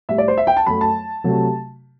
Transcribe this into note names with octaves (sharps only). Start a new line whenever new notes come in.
A2 G3 E5
D5
C5
E5
G5
A5
F#2 F#3 A3 B5
A5
C3 F#3 A3